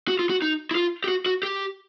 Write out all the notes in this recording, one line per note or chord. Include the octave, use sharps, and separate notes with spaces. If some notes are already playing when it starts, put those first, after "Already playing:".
F#4
F4
F#4
D#4
E4
F4
G4
F#4
F#4
G4